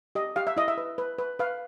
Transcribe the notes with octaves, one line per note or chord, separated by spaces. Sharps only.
G4 D#5
G4 F5
E5
E4 D#5
E5
B4
B4
B4
B4 F5